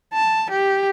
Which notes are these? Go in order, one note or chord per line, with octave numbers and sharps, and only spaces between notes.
A5
G4